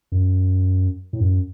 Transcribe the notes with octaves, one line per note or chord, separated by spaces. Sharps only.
F#2
A2
F#2